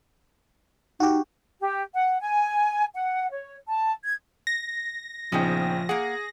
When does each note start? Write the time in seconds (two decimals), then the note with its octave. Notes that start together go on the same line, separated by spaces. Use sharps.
1.00 D#4 F#4 G4
1.60 G4
1.94 F#5
2.20 G#5
2.95 F#5
3.31 C#5
3.67 A5
4.03 G#6
4.47 A#6
5.32 A#1 C#3 F3 B3 C#4 D#4 G5
5.89 A#3 G#4 F#5